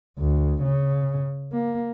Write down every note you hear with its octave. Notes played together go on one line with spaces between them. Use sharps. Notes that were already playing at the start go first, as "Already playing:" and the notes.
D2
C#3
A#3